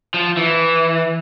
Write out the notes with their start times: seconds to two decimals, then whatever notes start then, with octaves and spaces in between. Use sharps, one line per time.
0.14 F3
0.37 E3